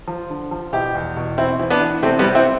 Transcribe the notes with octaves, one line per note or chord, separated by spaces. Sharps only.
F3
D3
F3
B2 E4 G4
E2
B2
E3 C4 E4
E3
B3 D4
E3
C3 A3 C4
G3 B3
C3
C4 E4